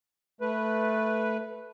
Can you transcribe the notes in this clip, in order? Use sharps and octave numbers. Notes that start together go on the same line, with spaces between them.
A3 B4